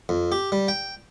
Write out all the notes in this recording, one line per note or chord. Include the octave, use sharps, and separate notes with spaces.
F2
G4
G3
G5